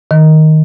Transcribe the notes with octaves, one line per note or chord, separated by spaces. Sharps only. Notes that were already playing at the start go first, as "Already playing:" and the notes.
D#3